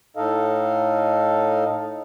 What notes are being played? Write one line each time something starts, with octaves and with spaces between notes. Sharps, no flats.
A2 D#4 A4 D#5 F5